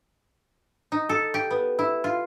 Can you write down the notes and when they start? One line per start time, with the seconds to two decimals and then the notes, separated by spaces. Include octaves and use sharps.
0.92 D#4
1.09 A4
1.34 G4
1.51 B3
1.79 E4
2.04 F4